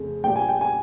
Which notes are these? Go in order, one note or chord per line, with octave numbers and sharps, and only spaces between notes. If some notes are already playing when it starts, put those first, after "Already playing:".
Already playing: F2 C#3 A3
A#1 A#2 G3 G5
G#5
G5
G#5